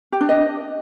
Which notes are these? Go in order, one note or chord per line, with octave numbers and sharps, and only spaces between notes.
G4
D4
D#5